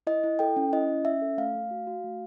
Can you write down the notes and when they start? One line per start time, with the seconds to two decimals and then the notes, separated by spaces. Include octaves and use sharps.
0.07 E4 D#5
0.24 E4
0.39 A4 G5
0.56 C#4
0.73 E4 D#5
0.88 C#4
1.05 C#4 E5
1.22 A4
1.38 A3 F5
1.55 A3
1.71 F#4
1.87 F#4
2.04 A3